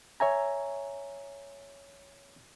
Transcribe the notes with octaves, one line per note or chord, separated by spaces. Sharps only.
C#5 E5 G#5 A#5